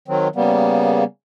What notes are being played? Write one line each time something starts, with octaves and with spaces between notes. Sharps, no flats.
D#3 F#3 C4
C#3 G3 A#3 B3